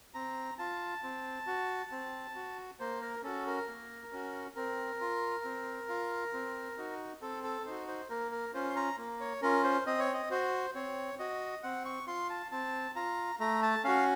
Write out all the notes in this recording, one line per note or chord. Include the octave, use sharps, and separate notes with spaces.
C4 A#5
F4 A5
C4
F#4
C4
F#4
A#3 C5
A#4
C#4 F#4 A4
A#4
A#3
C#4 F#4
C4 A#4
F4
C4
F4
C4
D#4 F#4
C4 A4
A4
D#4 C5
F#4
C5
A#3 A#4
A#4
C#4 F4 C5
C6
A#5
A#3
C#5
C#4 F4 A#4
C5
C4 D#5
C#5
D#5
F#4 C5
C4 C#5
F#4 D#5
C4 F#5
C#6
F4 C6
A5
C4 A5
F4 A#5
A3 A#5
A5
C#4 F#4 F5